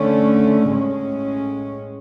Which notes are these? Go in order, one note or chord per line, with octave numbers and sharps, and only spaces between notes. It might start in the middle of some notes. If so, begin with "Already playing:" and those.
Already playing: D3 A3 C#4
A2 G#3 C#4